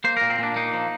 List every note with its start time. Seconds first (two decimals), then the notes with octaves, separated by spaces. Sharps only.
0.04 A#3 C5
0.17 A#2 A#4
0.30 C4
0.39 A#2 D4
0.56 A#3 D#4
0.73 F3